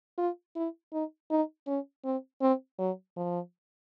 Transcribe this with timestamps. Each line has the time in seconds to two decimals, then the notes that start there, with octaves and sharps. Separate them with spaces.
0.18 F4
0.56 E4
0.92 D#4
1.30 D#4
1.67 C#4
2.05 C4
2.41 C4
2.79 F#3
3.17 F3